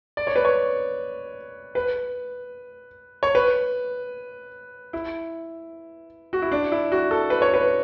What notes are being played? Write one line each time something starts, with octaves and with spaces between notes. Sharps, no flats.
D5
C#5
B4
C#5
B4
C#5
B4
E4
F#4
E4
D4
E4
F#4
A4
B4
C#5
B4